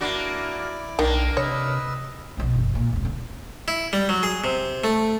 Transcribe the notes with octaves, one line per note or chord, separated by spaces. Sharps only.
A#3 D4 E4 F#4 D5 D6
B1 D#3 A#3 D4
C3 B4 C#5 D#5 E6
A#1 B2
F#1 E2
A#2
E1 D3
D3
E4
G3
F#3
G#4
C3
A3